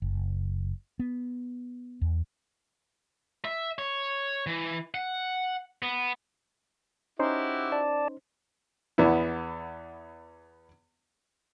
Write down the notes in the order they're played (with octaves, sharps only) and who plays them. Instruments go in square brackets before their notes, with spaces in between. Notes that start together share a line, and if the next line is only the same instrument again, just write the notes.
[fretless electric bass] F#1
B3
E2
[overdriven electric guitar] E5
C#5
E3
F#5
B3
[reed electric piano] C#4 D#4 C5 [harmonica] E4 F#4 G4
[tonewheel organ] D5 A5
[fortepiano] E2 B3 E4